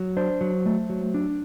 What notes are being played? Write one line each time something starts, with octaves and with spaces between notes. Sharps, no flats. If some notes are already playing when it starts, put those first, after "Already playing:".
Already playing: F#3
D4 C5
F#3
A3
F#3
D4